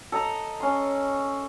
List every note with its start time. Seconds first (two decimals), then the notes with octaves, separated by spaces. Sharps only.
0.12 A4 D#5 A#5
0.60 C#4 C6